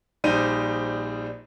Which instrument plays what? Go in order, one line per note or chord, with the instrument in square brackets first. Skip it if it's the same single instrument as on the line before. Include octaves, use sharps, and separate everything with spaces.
[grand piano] A#1 G3 D#4 C5 D#7